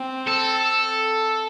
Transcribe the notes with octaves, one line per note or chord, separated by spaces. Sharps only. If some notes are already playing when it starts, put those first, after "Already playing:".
Already playing: C4
A4